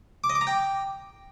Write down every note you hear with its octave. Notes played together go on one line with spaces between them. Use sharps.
D6
D#5
D6
A#5
G5